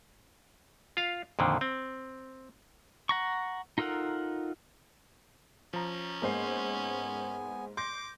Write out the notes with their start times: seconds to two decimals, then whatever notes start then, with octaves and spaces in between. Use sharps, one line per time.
0.97 F4 F5
1.39 F2 A#2 D3 D#3
1.61 C4
3.09 F#5 A#5 C#6
3.78 D#4 F4 A4 A#4 F#5
5.73 F3 C#4 A#5
6.22 G#2 A#3 B3 C5 G#5 C7
7.77 C6 D6 G6 A#6